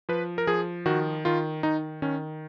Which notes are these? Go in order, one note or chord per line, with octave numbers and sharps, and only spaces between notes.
F3 B4
A#4
F3 G#4
D#3 F#4
D#3 F4
D#3 D#4
D#3 C#4